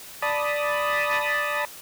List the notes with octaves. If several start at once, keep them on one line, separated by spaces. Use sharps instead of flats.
D5 A5 B5 D#6